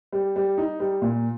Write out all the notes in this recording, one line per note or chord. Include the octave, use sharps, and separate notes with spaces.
G3
G3
D#4
G3
A#2